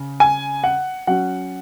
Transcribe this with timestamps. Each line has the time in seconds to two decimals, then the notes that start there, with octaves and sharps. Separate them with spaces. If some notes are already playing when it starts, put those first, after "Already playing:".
Already playing: C#3
0.20 G#5
0.64 F#5
1.07 F#3 C#4 F#5